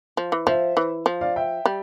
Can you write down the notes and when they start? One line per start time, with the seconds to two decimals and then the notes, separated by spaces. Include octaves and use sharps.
0.17 F3
0.32 E3
0.47 F3 C5 E5
0.77 E3
1.06 F3
1.21 D5 F5
1.36 E5 G5
1.65 G3